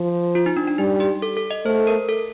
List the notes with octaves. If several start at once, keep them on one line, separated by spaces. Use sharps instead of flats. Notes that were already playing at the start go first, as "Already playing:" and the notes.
Already playing: F3
F4
D#4
D4
D4
G3 D#4
G4
A4
A4
D#5
A3 C5
A#4
A4